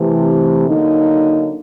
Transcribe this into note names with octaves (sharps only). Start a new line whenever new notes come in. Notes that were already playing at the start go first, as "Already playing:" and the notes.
Already playing: C3 E3 A3
D3 F#3 A#3 D#4